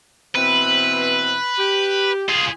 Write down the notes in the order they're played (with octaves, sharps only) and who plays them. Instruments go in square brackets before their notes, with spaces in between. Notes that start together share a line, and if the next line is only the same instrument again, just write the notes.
[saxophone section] B2 E3 C4 [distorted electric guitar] B4
[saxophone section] G4
[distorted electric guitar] F4 G#4